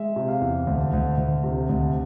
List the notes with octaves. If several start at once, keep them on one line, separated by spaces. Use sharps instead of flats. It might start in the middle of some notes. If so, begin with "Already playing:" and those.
Already playing: G#3 E5
C3
F5
E2
D2
D2
D2
C3
D2